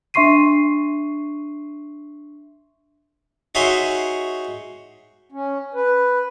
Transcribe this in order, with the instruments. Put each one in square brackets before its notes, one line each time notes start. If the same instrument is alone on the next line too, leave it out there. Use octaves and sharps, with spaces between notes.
[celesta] D4 E5 C6 C#6 C7 D#7
[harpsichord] D#4 F#4 G#4 C#5 E5 C6
[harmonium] C#4
B4